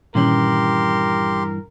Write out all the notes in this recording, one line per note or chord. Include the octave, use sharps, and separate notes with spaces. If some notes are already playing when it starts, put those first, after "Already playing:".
G2 A#2 D#3 E3 C#4 G4 A#4 C6